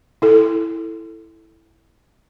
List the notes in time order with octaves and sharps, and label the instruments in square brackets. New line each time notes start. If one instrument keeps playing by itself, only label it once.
[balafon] E4 A4